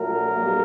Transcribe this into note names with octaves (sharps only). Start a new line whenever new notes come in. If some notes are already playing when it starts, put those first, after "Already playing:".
Already playing: A#1 A#2 F#3 A3 A#4
B1 B2 G3 A#3